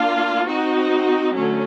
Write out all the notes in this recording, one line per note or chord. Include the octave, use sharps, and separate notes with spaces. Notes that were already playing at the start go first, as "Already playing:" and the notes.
Already playing: A#3 D4 F4
C4 D#4 F#4
D3 F#3 A3 C#4